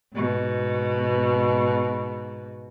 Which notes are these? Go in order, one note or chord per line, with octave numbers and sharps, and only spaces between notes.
G#2 B2